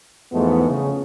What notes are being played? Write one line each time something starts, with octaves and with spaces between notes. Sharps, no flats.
E2 G#2 F3 G#3 A3 B3
C#3